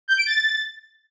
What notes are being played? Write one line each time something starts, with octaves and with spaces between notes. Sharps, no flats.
G6
D7
A6